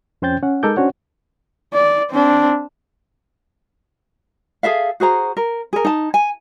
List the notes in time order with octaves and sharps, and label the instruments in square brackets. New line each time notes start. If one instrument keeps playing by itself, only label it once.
[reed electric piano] F2 C#4 C5 G5 G6 A6
C#4 F#5
G#3 D#4 A4 A#4 D6 G6
C#4 D4 F#4 C5 C#5 F#5
[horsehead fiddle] D5
C4 D4
[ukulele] G#4 A4 E5 F5
F#4 G#4 C5 A#5
A#4
G#4 A#4
D#4 A5
G#5